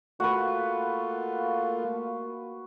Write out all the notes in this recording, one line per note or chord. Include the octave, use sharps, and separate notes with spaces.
A3 A#3 F4 F#4 B4